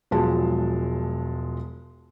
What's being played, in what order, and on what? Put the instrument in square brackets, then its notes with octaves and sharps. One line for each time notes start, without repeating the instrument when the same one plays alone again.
[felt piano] E1 F3 F#3 G#3 A5